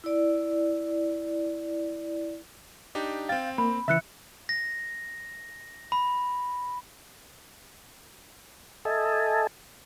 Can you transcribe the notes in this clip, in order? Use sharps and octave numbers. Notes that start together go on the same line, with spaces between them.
E4 D5
D4 D#4 G4
C4 F5 G5 A6
A#3 B5
C#3 E3 E5 B5 E6 F#6 C#7
A#6
B5
A4 D#5 E5 G#5 A5